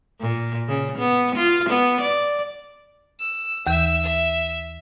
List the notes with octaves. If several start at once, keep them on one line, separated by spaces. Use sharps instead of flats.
A#2
C#3
B3
F4
B3
D5
E6
D#2 E3 E5 E6
E5